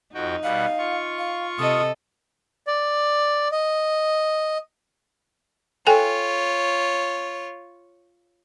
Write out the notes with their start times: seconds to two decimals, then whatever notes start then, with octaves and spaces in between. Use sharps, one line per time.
0.14 F2 D#4 F#4 G5
0.43 B2 G3 F5 F#5
0.78 F4 C#6
1.18 F5
1.59 C3 A4 D#5 D#6
2.67 D5
3.52 D#5
5.87 F4 A4 C#5 G5 G#5